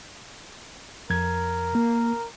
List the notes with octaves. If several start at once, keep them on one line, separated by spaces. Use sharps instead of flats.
F2 A#4 G#6
A#3